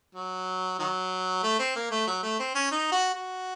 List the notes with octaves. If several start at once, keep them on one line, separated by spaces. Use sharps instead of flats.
F#3
D#3 F#3
A3
C4
A#3
A3
F#3
A3
C4
C#4
D#4
F#4
F#4